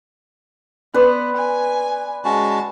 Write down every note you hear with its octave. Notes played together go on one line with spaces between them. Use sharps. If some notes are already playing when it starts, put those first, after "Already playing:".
B3 B4 D5 C6
G#5
G#3 C#4 F#4 A5